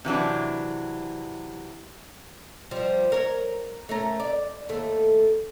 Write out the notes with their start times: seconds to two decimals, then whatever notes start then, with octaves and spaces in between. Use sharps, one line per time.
0.05 C3 E3 F#3 D4
2.71 F3 G3
3.12 A#4 C#5
3.89 A3 C#4 A#4
4.20 D5
4.69 D#2 A3